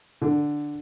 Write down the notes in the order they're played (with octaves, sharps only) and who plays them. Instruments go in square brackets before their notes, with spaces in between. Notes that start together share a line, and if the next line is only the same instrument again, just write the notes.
[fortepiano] D3